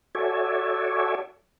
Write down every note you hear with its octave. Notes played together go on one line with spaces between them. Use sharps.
F#4 A4 C#5 D5 E5 G#5